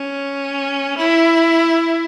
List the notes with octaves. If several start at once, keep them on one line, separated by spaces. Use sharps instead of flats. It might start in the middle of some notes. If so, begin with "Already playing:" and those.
Already playing: C#4
E4